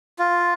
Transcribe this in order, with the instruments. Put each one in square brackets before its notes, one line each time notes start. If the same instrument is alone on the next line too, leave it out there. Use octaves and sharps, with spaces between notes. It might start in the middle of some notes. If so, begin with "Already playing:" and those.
[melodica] F4